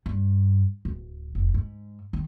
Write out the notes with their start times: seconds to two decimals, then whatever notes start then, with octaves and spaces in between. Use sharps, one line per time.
0.06 G2
0.85 D1
1.35 F1
1.54 G#2
2.13 D#3